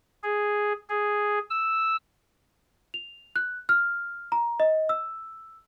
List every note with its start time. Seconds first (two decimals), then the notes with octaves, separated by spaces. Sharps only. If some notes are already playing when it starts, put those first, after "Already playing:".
0.23 G#4
0.89 G#4
1.50 E6
2.94 F7
3.36 F#6
3.69 F6
4.32 A#5
4.60 D#5
4.89 E6